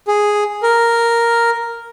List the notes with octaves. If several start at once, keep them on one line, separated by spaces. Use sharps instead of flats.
G#4
A#4